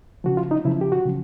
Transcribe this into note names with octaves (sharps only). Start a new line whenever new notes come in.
C#3 F3 F#4
F4
D#4
C#3 F3 E4
G4
F#4
C#3 F3